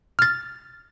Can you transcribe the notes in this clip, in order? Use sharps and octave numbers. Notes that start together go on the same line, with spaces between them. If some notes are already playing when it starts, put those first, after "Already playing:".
F6 A6